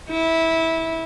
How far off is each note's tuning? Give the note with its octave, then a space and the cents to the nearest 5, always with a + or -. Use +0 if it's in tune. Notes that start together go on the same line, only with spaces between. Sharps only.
E4 -15